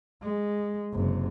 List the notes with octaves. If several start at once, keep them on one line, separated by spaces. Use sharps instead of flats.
G#3
F#1 C3